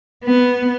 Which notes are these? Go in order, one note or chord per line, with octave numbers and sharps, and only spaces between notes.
B3